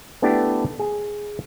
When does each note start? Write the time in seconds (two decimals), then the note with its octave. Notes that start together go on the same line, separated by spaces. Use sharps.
0.22 A3 B3 D4 E4 G4
0.79 G#4 G#5